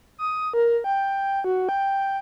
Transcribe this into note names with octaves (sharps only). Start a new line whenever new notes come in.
D#6
A#4
G5
F#4
G5